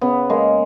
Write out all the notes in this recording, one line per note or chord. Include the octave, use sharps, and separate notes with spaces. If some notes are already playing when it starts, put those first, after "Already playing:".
C#3 B3
G#3 A#3